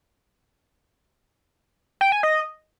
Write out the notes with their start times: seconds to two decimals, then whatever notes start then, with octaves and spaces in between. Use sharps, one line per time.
2.01 G5
2.12 G#5
2.23 D#5